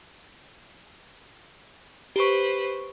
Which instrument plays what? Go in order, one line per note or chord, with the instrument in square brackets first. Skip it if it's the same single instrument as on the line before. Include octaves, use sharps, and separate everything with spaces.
[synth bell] G4 C#6 [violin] B4 C5